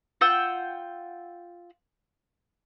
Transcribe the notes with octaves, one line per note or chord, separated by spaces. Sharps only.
F4 F#5 G5 E6